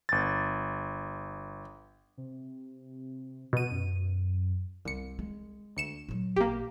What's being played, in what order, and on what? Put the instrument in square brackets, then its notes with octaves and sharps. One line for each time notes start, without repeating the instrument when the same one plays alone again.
[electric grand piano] G1 A6
[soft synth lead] C3
[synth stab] B2 D#7 [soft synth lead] F#4
[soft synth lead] F#2
[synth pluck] C2 C#7 [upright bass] G3
[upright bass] G#3
[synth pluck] D2 C#7 E7
[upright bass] A#2 F#3
[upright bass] A1 [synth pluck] A#3 G4